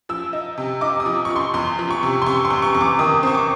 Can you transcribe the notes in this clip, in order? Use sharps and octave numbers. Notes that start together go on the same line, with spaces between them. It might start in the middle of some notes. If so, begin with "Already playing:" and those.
F3 E6
D#4
C3
D#4 D6
D#6
F3
C#6
F3
C6
E2 C6
F3
C#6
C3
C6
C3 C#6
C6
E2
C#6
E2
D6
D#3 D#6
C4 C#6
D6